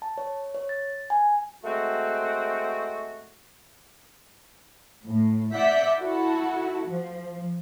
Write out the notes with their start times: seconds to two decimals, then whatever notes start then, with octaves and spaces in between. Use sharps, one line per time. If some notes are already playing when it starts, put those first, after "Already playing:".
0.02 A5
0.18 C#5
0.55 C#5
0.69 A6
1.10 G#5
1.64 G#3 A3 C4 F#4
5.04 A2
5.53 D5 E5 F#5 G6 B6
5.99 E4 F#4 A4
6.87 F3